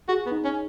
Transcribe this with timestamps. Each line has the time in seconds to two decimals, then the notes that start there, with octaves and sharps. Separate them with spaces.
0.08 F#4 G#4
0.26 B3
0.32 D#4
0.44 C#4